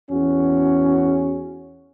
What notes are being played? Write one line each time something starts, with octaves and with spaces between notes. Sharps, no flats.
E2 C#4 F#4